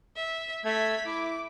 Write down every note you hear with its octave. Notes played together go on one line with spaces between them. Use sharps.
E5
A3 G#6 B6
E4 D6